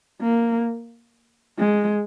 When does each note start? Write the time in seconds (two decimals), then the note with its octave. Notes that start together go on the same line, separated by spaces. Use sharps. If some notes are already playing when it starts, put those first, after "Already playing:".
0.21 A#3
1.58 G#3